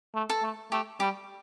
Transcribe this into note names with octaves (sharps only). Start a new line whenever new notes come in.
A3
A4
A3
A3 G4
G3 G4